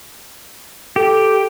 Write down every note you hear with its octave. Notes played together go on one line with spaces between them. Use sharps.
G4 A4